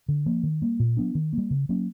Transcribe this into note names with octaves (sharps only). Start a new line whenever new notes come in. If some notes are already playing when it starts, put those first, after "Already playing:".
D3
F3 A#3
D#3
G3 A#3
A#2
F#3 B3 D4
D#3
G3 A#3
C#3
F#3 A#3 C#4